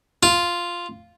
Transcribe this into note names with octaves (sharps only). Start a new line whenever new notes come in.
F4